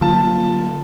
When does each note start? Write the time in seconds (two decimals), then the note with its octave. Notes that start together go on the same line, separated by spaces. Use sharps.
0.01 D3 F#3 A#3 F4 A5